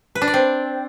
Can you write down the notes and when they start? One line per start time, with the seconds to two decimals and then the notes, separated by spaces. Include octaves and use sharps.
0.15 B4
0.22 D4
0.28 D5
0.34 C4